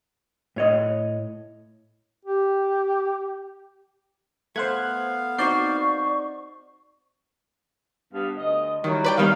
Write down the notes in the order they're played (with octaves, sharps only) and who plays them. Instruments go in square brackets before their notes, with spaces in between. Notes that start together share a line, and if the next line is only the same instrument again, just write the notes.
[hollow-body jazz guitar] A2 C#5 D#5
[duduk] G4
[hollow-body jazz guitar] A3 [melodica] B3 F5 [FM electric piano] C5 F#6 G#6
[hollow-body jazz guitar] C4 D#4 F#4 [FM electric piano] D5 G6 C7 [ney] C#6
[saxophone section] G2 B3 F5
D2 D#5
[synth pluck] D#3 [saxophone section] F#3 G3 E4
[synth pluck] B4 D5 G5
[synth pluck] D#3 G3 B3 [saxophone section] F5